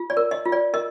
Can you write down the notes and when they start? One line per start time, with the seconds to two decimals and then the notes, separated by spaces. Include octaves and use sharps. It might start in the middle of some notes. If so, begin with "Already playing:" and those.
Already playing: F4
0.10 D5
0.17 A#4
0.31 D#5
0.45 F4
0.52 D5
0.74 A#4 D#5